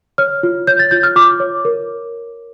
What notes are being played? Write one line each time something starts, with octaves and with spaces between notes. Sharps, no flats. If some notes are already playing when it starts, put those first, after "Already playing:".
C#5 F6
F4
C#5 G6
A6
F4 G6
F6
F4 D6
C#5
A#4